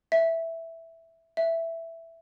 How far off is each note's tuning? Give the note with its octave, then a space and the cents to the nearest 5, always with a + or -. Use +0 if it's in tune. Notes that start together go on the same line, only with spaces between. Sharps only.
E5 +0
E5 +5